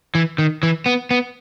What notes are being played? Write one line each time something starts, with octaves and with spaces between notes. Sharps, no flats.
E3
D#3
E3
B3
B3